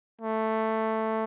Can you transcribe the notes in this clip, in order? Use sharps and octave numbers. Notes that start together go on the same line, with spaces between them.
A3